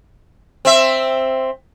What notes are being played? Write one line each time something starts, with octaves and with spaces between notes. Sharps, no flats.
C4 E5